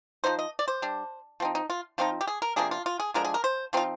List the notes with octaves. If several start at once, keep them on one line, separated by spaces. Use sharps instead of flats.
F3 A#3 D#4 C5
D#5
D5
C5
G3 D4
F3 C4 D#4
D#4
F4
F3 C4 D#4 F4
G4
G#4
A#4
C3 F3 A#3 D4 G#4
F4
F4
G#4
D3 F3 G#3 D4 A#4
G#4
A#4
C5
F3 C4 D#4 F4